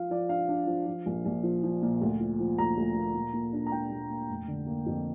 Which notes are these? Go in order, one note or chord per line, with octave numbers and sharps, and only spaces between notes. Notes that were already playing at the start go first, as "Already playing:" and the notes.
Already playing: F3 F4 F5
F3 D5
D4 F5
D4
F3
F3
A#1
A#1
F3
F3
A#2
D2
F3
F3
D2 A#5
D2
A#3
A#2
A#2
D4
A#5
A#2 G5
A#2
A#3
F1
D3
A#3
F2